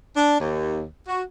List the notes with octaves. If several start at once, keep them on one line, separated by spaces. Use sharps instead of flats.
D4
D#2
F#4